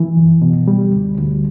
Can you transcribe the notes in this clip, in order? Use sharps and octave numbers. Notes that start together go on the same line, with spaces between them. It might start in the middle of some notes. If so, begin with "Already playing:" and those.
Already playing: E3
F#2
B2
G3
D2
D2